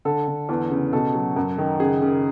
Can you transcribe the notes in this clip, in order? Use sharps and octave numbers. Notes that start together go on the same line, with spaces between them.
D3 A4
D3
E2
C#3
B2 A4
F#3
F#2
D#3
C#3 G#4
C#3